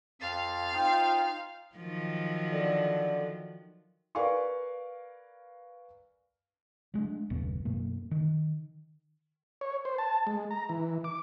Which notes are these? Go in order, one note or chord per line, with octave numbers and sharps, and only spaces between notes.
F2 F5 A6
D#4 F4 C5 G5
D#3 F3 F#3
D3
A#4 B4 D5 F5 G#5 C#6
F#3 G#3 A3 D4
F#1 D#2 B2 B3
F#2 B2 A#3
D#3
C#5
C5
A5
G#3
A#5
E3
D6